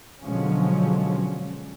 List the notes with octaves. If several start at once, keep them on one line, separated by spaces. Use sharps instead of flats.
B2 D3 F3 F#3 G#3 C#4